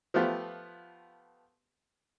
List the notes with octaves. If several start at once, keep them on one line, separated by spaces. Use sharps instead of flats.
F3 A3 B3 F4 G4